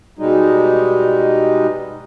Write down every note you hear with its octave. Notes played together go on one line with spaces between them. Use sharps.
B2 G3 G#3 D#4